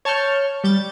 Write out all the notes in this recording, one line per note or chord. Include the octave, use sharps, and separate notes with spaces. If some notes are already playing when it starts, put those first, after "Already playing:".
C#5 A5 C#6 F6 G6
G3 G6 A6